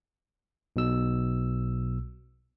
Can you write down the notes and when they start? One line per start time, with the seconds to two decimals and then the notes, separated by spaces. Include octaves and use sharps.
0.76 B1 B2 E6